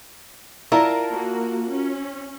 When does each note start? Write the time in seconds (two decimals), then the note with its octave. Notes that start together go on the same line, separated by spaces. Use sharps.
0.72 E4 F4 A#4 D5 A5 A#5 E6
1.10 A#3 F#4
1.70 C#4